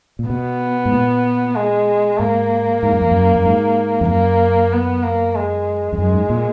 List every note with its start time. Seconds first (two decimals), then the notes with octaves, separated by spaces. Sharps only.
0.19 A#2
0.29 B2 B3
0.85 G#2
0.93 A#2
1.56 G#3
2.19 G#2 A#3
2.83 G#2
2.92 F#2
3.01 F2
3.11 F#2
3.36 F#2
3.46 G#2
4.01 F2
4.09 F#2 A#3
4.73 B3
5.03 A#3
5.35 G#3
5.93 F2
5.98 F#2 G#3
6.14 G#2
6.30 A#2